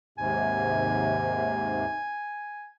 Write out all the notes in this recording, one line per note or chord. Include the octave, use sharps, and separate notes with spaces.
D#2 G#2 C3 G#5